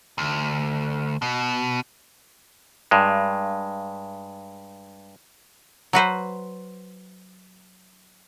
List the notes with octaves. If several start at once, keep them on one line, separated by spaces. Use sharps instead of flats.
D2
B2
G2 G#3
F#3 F#4 B4 C5